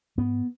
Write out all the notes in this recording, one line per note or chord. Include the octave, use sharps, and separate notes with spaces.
G#2 B3